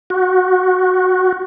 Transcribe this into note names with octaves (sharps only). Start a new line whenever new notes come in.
F#4